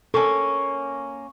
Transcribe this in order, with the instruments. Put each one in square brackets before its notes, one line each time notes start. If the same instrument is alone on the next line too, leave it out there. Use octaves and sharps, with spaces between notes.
[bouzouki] A#3 C#4 [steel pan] A4 [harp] C#6